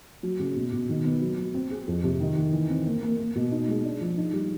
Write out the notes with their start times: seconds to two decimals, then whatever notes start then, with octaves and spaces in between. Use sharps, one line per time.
0.23 F#3
0.40 C#3
0.56 B2
0.72 B2
0.89 D#3
1.05 B3
1.21 F#3
1.38 F#3
1.54 C4
1.70 G#4
1.87 F2
2.04 C3
2.20 D#3
2.37 D#3
2.53 E3
2.69 C4
2.86 A#3
3.03 A#3
3.18 A#3
3.35 B2
3.51 D#4
3.68 G#3
3.84 D4
4.01 F3
4.17 D#4
4.33 G3